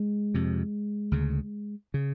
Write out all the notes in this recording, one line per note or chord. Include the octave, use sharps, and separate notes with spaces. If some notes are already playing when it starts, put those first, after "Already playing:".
Already playing: G#3
F2 C3
D2 C#3
C#3